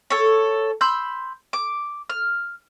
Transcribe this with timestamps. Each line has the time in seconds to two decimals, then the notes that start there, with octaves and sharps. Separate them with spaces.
0.10 A4 C#5
0.81 B5 C6 E6 G6
1.53 D6
2.10 F6